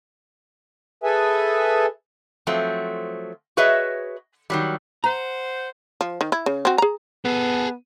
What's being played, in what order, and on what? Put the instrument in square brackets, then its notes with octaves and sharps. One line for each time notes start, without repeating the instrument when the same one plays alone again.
[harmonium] G#4 A4 B4 E5 G#5
[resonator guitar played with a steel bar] F3 F#3 A3 C4
F#4 G#4 B4 C#5 D#5 E5
D#3 F#3 G3
[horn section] C5 F#5 [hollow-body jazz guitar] A#5
[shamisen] F3
D#3
E4
C#3
C4 F#4
G#4 A#5
[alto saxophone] B3 [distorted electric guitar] G#4 A4